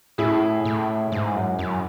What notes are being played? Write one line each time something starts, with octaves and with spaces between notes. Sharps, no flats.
A2 E4 G#4
A2
G#2
F#2
F#2